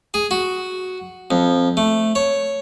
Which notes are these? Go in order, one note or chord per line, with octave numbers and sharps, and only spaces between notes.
G#4
F#4
F2
A3
C#5